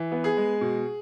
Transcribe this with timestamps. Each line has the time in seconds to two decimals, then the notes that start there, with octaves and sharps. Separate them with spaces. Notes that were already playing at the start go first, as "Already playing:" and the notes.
Already playing: E3
0.12 B3
0.24 G#4
0.37 G#3
0.61 B2